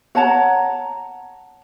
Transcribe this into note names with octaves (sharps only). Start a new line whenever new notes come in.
C#5 F#5 A5 A#5